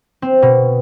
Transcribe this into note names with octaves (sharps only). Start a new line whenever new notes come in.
C4
B2